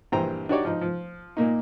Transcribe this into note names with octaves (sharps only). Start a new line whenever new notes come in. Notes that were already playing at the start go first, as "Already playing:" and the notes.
A#1 G2 E3 C5 G5 A#5
D4 D#4 F#4 G4 C#5 D5
F3 D#4
F3
A#2 A#3 D#4